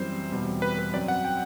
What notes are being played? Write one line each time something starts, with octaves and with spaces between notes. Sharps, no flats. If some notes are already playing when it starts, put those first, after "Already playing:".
Already playing: F#2 E3 G3 C4 C5
E2 B2 G3 C4
B4
B4
F#2 F#3 C4 D5
F#5
G5